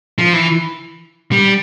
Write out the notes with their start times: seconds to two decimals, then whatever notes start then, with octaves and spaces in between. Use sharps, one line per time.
0.19 F3
0.33 E3
1.32 G3